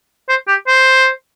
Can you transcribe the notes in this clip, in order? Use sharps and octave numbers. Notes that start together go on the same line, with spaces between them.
C5
G4
C5